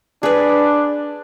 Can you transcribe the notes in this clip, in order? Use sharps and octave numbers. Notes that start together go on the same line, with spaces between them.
D4 G#4 B4